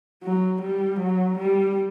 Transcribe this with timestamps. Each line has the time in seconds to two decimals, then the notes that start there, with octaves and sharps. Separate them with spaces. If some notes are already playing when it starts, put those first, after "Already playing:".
0.23 F#3
0.62 G3
0.99 F#3
1.38 G3